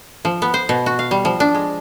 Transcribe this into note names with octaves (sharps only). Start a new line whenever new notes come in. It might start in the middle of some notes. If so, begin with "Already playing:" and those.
F3
B3
C5
B2
F#4
F5
G3
F3
D4
G#3